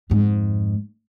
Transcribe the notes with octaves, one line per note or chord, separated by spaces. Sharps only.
F2 G#2